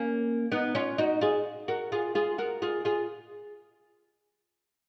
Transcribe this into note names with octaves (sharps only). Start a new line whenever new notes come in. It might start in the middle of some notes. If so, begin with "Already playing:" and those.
Already playing: A#3 C#4
B3 D#4
C#4 F4
D#4 F#4
F4 G#4
F#4 A#4
F4 G#4
F4 G#4
F#4 A#4
F4 G#4
F4 G#4